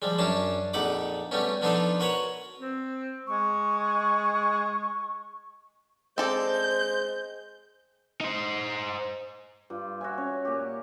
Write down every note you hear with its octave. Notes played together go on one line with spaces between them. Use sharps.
F3 G3 G#3
F#2 C#4 D4 A5
A#1 F2 D#4 F#5 B5 D6
G3 A3 B3 C#4
F3 B3 D4 D#4 F4 A4
F#4 A#4 B4 C#5 F#5
C4
G#3 C#6
G#3 C4 A4 C5 D5 G6
D#4 C5
G2 F4
F#4 E5 G#5
C#4 C#5
A#2 G4